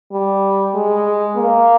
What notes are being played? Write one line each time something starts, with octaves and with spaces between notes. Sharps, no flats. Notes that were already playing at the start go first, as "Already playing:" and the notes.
G3
G#3
A#3